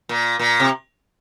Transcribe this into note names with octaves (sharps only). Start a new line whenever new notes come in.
A#2
A#2
C3